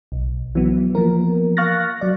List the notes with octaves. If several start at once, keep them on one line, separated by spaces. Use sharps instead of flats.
B1
E3 F#3 B3
F3 A#3 B3 A#4
F5 C#6 F6 F#6 A6 A#6
F#3 D5